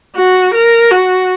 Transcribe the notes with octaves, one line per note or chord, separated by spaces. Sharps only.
F#4
A#4
F#4